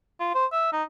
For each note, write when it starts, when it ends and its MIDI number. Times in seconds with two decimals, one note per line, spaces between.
0.20 0.31 65
0.35 0.46 72
0.53 0.71 76
0.73 0.83 63